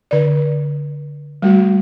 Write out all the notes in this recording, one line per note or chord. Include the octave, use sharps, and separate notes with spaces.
D3 D5
G3 A3 F#4